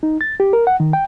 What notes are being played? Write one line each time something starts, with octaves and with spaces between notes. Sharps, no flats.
D#4
A6
G4
A#4
F#5
D#3
G5